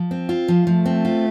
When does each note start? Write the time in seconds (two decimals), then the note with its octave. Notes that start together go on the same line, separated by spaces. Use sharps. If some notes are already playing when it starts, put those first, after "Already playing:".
Already playing: F3
0.11 C4
0.29 F4
0.48 F3
0.66 F3 A3
0.86 C4
1.05 F4